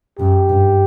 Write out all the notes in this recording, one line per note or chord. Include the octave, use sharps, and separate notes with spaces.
F#2 G4
G2